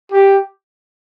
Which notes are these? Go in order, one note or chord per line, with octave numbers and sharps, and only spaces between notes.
G4